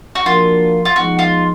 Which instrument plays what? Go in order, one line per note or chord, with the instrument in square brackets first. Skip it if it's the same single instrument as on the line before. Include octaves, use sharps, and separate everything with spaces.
[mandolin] F#4
[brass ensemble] F3 A#3 D4 F#4 A#4 [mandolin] F4
[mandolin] F4
[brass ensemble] F3 G#3 B3 D#4 [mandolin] F#4
[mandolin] F4